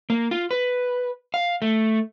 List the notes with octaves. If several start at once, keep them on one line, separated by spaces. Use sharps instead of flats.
A#3
F4
B4
F5
A3